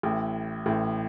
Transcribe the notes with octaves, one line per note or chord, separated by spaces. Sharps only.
A1 A2
A1 A2